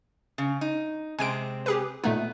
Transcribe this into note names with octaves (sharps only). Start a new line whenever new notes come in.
C#3
D#4
C3 G#3 C4 G#5 D7
G4 G#4 B4
A#2 A3 B3 D#4